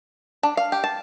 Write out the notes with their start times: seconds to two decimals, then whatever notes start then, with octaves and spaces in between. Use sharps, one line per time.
0.43 D4
0.57 F5
0.72 G4
0.84 A5